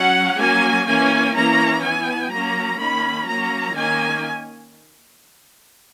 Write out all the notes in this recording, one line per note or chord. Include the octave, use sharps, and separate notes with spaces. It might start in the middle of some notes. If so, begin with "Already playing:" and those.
Already playing: F#3 C#4 F#5
F#3 A#3 C#4 G#5
E3 A#3 C#4 G#5
E3 A#3 C#4 A#5
E3 B3 G#5
F#3 A#3 C#4 A#5
D#3 A#3 C#4 B5
F#3 A#3 C#4 A#5
D#3 A#3 C#4 G#5